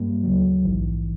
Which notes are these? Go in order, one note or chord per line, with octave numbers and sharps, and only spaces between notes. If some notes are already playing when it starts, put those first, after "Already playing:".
Already playing: G2 G3 A#3
D2 C#3 F#3
A#1 G#2 E3